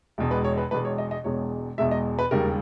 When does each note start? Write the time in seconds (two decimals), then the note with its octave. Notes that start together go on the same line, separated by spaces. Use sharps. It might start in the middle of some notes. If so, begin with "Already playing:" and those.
0.18 E1 E2 B2 G#3
0.31 B4
0.44 C#5
0.57 B4
0.71 E1 E2 B2 G#3 B4
0.85 C#5
0.98 D#5
1.11 D#5
1.24 E1 E2 B2 G#3 C#5
1.78 E1 E2 B2 G#3 E5
1.91 D#5
2.19 B4
2.31 E1 D#2 C#3 G3 A#4